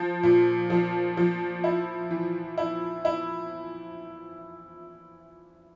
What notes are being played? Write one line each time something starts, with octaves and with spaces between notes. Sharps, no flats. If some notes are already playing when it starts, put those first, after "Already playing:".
Already playing: F3
A#2
F3
F3
E4
E3
E4
E4